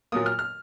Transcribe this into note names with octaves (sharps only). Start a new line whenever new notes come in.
A#2 F#3 A#3 D#6
F6
F6